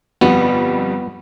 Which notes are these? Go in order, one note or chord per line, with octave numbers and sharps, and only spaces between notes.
G1 F2 G3 B3